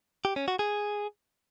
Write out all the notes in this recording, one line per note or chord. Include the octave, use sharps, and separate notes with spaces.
G4
C#4
F#4
G#4